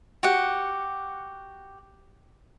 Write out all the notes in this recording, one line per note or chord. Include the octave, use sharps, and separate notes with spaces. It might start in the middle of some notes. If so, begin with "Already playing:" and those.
F#4 G4 F#5